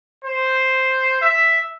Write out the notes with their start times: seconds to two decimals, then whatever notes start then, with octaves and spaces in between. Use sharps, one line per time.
0.23 C5
1.22 E5